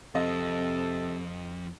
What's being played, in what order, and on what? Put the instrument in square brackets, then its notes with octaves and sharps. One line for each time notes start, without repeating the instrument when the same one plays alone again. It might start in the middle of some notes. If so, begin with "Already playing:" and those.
[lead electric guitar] F2 [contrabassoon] C3 [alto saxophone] A4 [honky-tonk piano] D#5